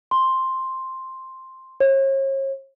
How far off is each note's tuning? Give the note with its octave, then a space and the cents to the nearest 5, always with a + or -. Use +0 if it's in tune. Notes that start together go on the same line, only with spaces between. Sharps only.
C6 +5
C#5 -40